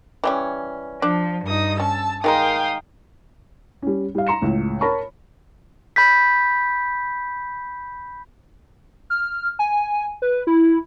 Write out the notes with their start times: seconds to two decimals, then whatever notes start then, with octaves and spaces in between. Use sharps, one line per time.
0.24 E3 G3 C#4
1.02 F3 D4
1.46 G2 D#4 D#6
1.80 C#4 A5 E6
2.24 D#3 G#3 A#4 F5 G5 D#6
3.82 G3 C#4
4.15 G3 F5
4.27 A#5 C6 C#7 E7
4.42 C#2 A2
4.81 A#4 C#5 A5 B5 C#6
5.96 B5 G6 B6
9.10 F6
9.59 G#5
10.22 B4
10.47 E4